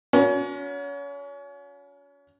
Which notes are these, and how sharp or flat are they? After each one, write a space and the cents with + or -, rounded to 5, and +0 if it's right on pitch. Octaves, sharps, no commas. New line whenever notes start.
C#4 +35 F#4 -30 A#4 +45